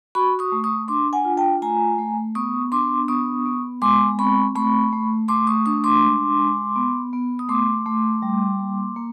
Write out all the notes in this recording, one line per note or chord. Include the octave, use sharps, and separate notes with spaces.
F#4 B5 C#6
C#6 D#6
A3
C#6 D#6
D4 C6 D6
F#5 G#5
F4
G5 A5
A3 G#5 A#5
A3
B3 C#6 D#6
D4 C6 D6
B3 C#6 D#6
B3
G#3 C6 D6
C4 B5 C#6
A3 B5 C#6
A3
A3 C6 D6
C#6 D#6
D4 C#6 D#6
C6 D6
G#3
G#3
B3
B3
D#6
A3 C6 D6
A3
G3
A#3
A#3